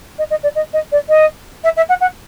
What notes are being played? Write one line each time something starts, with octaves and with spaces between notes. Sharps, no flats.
D#5
D#5
D5
D#5
D#5
D5
D#5
E5
E5
F#5
F#5